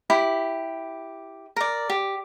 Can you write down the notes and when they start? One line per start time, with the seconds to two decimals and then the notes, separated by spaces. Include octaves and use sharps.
0.10 E4 G4 B5
1.56 A#4 D5
1.90 G4